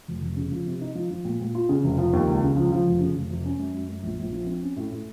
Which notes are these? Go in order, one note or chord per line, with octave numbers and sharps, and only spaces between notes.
F1
F1
C#3
F3
C3
D#4
F3
F3
A#2
A#2
F4
C#3
F1
F3
D#2
C#2
C#3
F3
F3
F1
C#3
F1
F1
C#4
F#2
F#2
F#2
A#1
A#1
F3
C4
C#4
A2
A2